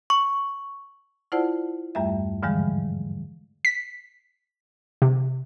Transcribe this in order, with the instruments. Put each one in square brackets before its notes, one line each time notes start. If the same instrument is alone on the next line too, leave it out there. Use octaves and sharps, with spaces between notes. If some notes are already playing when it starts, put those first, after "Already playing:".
[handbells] C#6
[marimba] E4 F4 C5 D5 F#5 A5
E2 G2 G3 A3 E5
G#2 D3 E3 F3 G3 G#3
[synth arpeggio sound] B6
C3